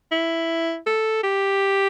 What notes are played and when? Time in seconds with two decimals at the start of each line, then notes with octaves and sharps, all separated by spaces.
0.11 E4
0.87 A4
1.23 G4